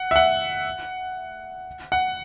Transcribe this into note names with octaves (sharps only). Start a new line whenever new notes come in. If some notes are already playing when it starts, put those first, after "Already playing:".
Already playing: F#5
E5
F#5
F#5